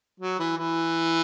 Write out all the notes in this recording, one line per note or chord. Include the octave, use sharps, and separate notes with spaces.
F#3
E3
E3